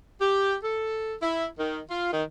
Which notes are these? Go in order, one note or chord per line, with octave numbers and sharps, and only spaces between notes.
G4
A4
E4
D#3
F4
D#3